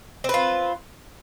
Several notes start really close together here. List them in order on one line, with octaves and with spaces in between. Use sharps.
C4 B4 F4